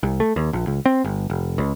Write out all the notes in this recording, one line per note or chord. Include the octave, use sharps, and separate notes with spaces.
C2
A3
D#2
A#1
C#2
C4
G1
F1
C#2